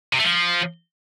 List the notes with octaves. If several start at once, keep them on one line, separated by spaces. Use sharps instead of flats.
C3
A3
F3